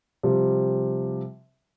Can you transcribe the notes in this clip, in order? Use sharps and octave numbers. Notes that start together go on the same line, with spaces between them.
C3 F3 G3